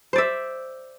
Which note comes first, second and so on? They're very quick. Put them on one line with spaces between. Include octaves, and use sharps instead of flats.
C5 D5 E5